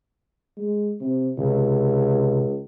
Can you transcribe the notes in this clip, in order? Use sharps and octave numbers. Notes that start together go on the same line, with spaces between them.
G#3
C3
C#2 C3